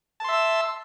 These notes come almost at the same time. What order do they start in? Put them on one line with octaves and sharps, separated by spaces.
A5 C6 E5 E6